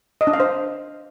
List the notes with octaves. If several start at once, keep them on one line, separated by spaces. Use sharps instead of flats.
D#5
D4
F5
C5